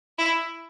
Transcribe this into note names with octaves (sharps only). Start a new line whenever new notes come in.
E4